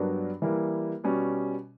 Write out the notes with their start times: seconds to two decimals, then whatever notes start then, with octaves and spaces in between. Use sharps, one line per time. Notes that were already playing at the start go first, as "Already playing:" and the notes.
Already playing: G2 F#3 B3 D4 A#4
0.42 E3 G3 A#3 E4
1.04 B2 G3 C#4